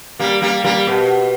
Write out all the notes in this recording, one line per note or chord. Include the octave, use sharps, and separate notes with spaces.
G3 A#3
G3 A#3
G3 A#3
B2